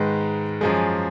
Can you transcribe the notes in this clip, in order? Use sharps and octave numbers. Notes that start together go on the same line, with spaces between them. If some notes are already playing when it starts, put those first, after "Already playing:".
Already playing: G#2 D#3 G#3 B4
F#2 F3 G#3 G#4